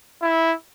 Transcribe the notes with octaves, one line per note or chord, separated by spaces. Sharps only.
E4